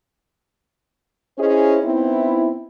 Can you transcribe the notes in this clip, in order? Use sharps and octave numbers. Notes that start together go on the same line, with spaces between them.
C#4 E4 G#4 C5 C#5 D#5
B3 C4 D#4 E4